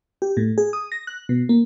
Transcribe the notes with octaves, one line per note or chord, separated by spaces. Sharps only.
G4
A2
G#4
D#6
A#6
F#6
B2
A#3